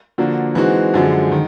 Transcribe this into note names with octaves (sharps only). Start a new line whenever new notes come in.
D3 F3 A#3 D4 F#4
E3 G#3 C4 D#4 F#4
F#2 D3 F3 G#3
D#3